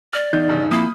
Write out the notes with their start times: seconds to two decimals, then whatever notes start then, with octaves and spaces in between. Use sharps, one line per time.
0.13 D5 F6
0.33 E2 D#4 G6
0.48 E1 G2 C#3
0.71 F2 A#2 A#3 E4 B5 D#6